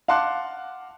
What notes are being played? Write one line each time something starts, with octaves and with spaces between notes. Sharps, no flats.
F5 F#5 A5 C6 D6 F#6